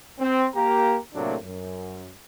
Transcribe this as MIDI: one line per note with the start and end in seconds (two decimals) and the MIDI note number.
0.19 0.46 60
0.55 0.96 58
0.55 0.96 67
0.55 0.96 82
1.14 1.36 45
1.14 1.36 48
1.14 1.36 54
1.14 1.36 57
1.14 1.36 58
1.14 1.36 62
1.42 2.10 42